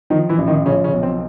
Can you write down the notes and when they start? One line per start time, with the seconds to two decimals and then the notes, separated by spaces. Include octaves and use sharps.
0.10 D#3 F3 D#4
0.29 E3 E4
0.38 A1
0.47 D#3 D#4
0.66 C#3 F3 C#4
0.84 C#3 C#4
0.94 B1
1.03 C4